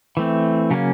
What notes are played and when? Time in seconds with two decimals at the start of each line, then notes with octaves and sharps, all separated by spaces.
0.17 E3 A3 C4
0.71 C#3 F#3 A#3 C#4